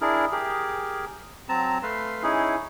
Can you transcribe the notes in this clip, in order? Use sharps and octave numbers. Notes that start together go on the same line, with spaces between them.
D4 E4 G#4 A#4
G4 G#4 A#4
F#3 C4 A5 A#5
A3 B4 F5 C6
C#4 D#4 E4 G#4